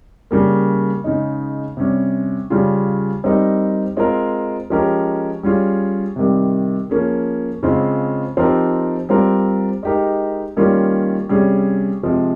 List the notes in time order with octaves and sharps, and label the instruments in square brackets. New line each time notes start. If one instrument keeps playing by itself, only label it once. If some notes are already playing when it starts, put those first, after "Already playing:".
[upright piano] C#3 G3 A#3
C#3 G#3 D#4
C3 G3 C#4
C#3 G3 C#4 F4
G3 C4 D#4 A#4
G#3 C4 F4 A#4
F3 G#3 C#4 G4 A#4
G3 C#4 F4 G#4
C3 D#3 G3
F3 A#3 C#4 G#4
C#3 G#3 C4 F4
F3 C4 D#4 G4 A#4
G3 C4 F4 A#4
G#3 D#4 G4 A#4
D#3 G3 A#3 C#4 F4
C3 G3 C#4 G#4
C3 F3 G#3